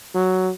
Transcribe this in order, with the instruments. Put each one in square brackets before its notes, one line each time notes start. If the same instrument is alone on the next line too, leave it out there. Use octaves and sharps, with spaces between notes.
[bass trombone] F#3